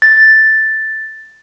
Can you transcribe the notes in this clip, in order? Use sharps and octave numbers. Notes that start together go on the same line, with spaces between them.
A6